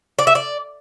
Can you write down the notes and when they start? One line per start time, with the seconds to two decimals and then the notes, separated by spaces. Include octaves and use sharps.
0.19 D5
0.27 E5
0.35 D5